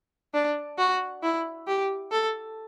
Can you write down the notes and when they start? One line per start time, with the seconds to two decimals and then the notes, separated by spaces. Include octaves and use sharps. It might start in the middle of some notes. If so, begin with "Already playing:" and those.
0.34 D4
0.78 F#4
1.23 E4
1.67 G4
2.12 A4